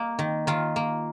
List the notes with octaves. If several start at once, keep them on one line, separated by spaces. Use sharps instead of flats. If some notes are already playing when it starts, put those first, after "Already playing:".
Already playing: A#3 D#5
D#3
D#3 F4
A#3